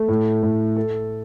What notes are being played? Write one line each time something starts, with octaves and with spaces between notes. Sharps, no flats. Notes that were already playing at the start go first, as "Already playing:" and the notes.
Already playing: A3
A2
A2
A4